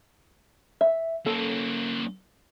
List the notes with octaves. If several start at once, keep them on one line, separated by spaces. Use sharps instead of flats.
E5
A#3 C#4 A4